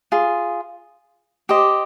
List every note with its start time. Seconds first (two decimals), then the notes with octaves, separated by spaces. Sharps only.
0.12 F4 G#4
1.49 G4 C5 D#5